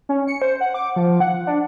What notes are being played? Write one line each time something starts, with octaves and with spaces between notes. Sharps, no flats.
C#4
C#7
C5
F#5
D6
F3
F#5
D4